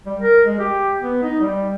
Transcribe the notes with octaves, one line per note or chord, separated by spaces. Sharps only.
G3
A#4
G#3
G4
B3
D#4
G3